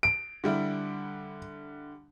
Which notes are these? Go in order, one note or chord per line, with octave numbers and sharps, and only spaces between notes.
D7
D3 G3 E4